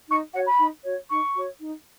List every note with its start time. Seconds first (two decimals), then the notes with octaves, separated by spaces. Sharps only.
0.08 D#4 C#6
0.33 F#4 C#5 F#5
0.46 B5
0.59 D#4
0.84 F#4 C#5
1.10 D#4 C#6
1.35 F#4 C#5
1.60 D#4